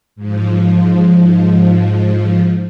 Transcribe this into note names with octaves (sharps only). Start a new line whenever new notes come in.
G#2 F3